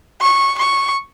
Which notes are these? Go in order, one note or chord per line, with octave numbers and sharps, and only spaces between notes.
C#6
C#6